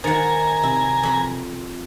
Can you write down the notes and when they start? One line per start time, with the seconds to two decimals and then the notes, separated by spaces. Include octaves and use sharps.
0.04 D#3 C5 F#5 G#5 A#5 A6 C#7
0.63 C3 E4
1.03 F2 B5